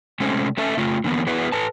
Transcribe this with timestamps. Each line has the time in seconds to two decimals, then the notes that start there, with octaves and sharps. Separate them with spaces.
0.20 C3 G#3 A3 C4 C#4
0.57 A3 C#4 A4 E5
0.77 C#3 A3 F4
1.04 D3 E3 A#3 B3
1.27 B3 E4 F#4 G#4 B4
1.52 A4 B4 A5